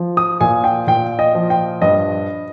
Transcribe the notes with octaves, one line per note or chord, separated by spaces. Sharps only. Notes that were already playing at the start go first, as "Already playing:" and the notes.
Already playing: F3
D#6
A#2 G#5
G5
A#2 G5
D#5
F3
G5
G2 D#5